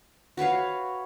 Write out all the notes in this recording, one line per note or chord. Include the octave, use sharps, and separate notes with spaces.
F#4 B4 C#5 F5